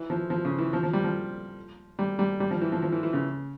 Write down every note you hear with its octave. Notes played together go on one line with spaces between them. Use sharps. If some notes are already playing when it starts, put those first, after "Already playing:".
Already playing: E3
F3
F3
C#3
E3
F3
F3
G3
F3
G3
G3
G3
F3
E3
F3
F3
E3
E3
C#3